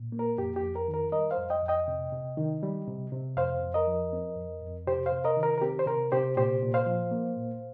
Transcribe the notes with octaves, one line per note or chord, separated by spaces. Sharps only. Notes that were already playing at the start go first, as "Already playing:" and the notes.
Already playing: A#2
A#3
A#4
F2 G4
G4
F2
A#4
D#3
A#4
G3 A#4 D#5
C5 F5
F2
D#5 G5
F2
D#5 G5
C3
C3
D#3
G3
C3
C3
F2 C5 F5
F2
A#4 D#5
F3
C4
F2
F2
C3 G4 C5
C5 F5
C3
A#4 D#5
D#3
A#4
A#4
C4 G4
C5
C3 A#4
C3 G4 C5
A#2 G4 C5
A#2
C5 F5
F3
A#3
A#2